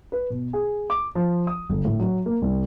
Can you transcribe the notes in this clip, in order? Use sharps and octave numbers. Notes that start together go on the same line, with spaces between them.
B4
B2
G#4
D6
F3
D#6
G1
A2
F#3
A#3
C2